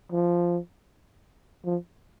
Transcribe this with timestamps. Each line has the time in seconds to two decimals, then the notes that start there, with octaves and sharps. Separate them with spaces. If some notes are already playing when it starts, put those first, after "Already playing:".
0.12 F3
1.65 F3